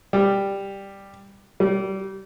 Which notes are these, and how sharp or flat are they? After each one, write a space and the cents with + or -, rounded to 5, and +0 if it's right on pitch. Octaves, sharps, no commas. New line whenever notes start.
G3 +5
G3 -30